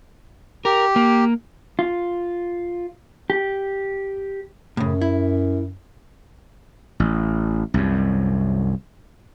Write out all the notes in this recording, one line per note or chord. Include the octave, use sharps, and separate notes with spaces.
G4 A#4
A#3
F4
G4
F#2 A2 C#3
E4
A1
C2 F#2